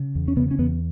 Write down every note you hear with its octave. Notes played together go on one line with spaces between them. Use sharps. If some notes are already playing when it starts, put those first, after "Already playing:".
Already playing: C#3
E2
C#4
C#3 B3
C#4
E2 B3